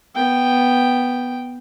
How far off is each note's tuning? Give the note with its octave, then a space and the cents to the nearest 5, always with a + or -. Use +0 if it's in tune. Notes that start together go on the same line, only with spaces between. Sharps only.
B3 +0 G5 +0